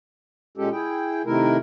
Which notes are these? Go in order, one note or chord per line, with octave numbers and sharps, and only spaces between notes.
A#2 G#3 C#4 G4 A4
E4 G#4 G5
C3 D#3 A3 E4 A#4